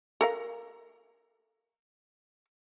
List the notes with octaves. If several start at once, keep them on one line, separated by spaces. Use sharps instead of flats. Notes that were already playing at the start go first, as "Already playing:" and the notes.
A4 A#4 F5